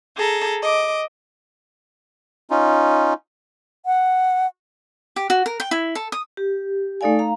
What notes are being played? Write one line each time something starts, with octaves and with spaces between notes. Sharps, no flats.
G#4 A4 A#5
D#5 D6
C#4 D#4 F4
F#5
G4
F#4
A#4
G5
E4
A4
D#6
G4
A3 D#4 A4 D5 F5 G#5
F5 A#5